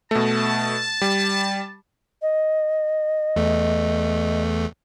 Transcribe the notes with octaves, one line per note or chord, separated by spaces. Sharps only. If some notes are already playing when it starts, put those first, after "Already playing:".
B2 A3 A5
G3
D#5
E2 A3